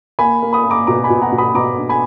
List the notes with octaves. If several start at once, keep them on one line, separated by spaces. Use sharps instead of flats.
A#3 G#5 B5
A#3
B5 D#6
A#3
A#5 D6
B2 A#5 D6
G#5 B5
B2
F#5 A#5
B2
B5 D#6
B2 A#5 D6
D4
G#5 B5